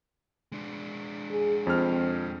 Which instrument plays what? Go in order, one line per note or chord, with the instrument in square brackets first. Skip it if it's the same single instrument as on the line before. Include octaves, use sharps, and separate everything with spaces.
[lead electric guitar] G#3 D4
[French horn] G#4
[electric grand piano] F2 F6 [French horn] C4